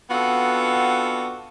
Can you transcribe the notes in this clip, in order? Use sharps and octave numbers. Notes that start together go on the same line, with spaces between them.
B3 C4 D4 F4 F#4 A4